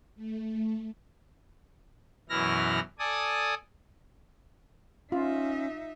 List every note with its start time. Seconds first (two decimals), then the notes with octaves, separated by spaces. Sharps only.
0.16 A3
2.29 F#2 B2 E3 E4 F6 A#6
2.99 A4 D5 G#5 D#6
5.12 C#4 D#4 F4 E5